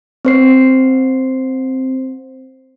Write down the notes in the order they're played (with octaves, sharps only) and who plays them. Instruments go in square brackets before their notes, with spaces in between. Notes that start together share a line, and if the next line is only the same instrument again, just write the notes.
[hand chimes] C4 C5 C7